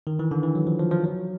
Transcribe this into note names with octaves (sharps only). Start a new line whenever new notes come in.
D#3
E3
D3
E3
F#3
F3
F3
F3
F#3